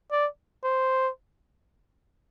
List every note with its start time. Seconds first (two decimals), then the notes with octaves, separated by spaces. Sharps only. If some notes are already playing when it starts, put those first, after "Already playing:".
0.11 D5
0.64 C5